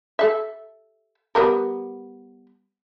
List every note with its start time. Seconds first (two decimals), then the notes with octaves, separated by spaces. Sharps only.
0.19 A4 E5
1.35 G3 B3 A#4